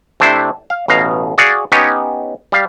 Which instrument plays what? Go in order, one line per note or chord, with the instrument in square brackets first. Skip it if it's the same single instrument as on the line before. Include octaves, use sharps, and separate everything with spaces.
[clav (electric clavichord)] C3 A3 D4 E4 C5
F5
A1 B2 F5 A#5
F#4 G#4 D5 F5 F#5
B3 C#4 D#4 G4 C#5
G3 F5